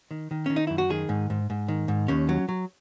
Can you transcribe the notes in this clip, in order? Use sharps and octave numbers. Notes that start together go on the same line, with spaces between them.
D#3
D#3
D#3 C#4
D#4
F#2 E4
F#4
D#3 G#4
G#2
G#2
G#2
D#3
G#2
D#2 C#4
F#3
F#3